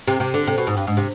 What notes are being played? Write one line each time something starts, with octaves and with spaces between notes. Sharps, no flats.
C3
C3
D3
C3
B2
G#2
G2
G#2
C3